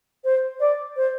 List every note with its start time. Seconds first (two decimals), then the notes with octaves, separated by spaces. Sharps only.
0.24 C5
0.60 D5
0.96 C5